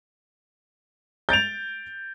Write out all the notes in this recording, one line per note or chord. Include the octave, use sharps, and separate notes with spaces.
G6 A6 D7 F7